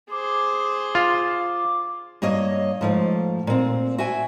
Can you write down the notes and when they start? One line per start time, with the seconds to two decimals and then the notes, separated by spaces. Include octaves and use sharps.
0.11 G#4 C5 D6
0.95 F4
2.22 G2 A#3 C#5 D#5
2.81 G#2 F3 A3 F5
3.47 A#2 C4
3.98 F#4 E5 G5 G#5